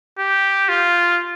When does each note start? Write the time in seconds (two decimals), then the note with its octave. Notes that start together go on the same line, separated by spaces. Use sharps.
0.19 G4
0.69 F4